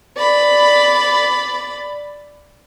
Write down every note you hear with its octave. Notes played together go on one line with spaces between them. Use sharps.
D5 B5